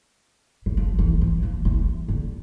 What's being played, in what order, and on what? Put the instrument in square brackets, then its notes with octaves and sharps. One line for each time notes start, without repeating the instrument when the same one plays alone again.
[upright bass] E3
F3
E3
E3
F3
E3
D3